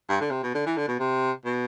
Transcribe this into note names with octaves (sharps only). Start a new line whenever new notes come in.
G2
D3
C3
B2
D3
E3
D3
B2
C3
B2